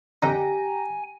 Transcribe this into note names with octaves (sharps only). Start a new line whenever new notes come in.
F2 D3 D#4 G4 G#5 A#5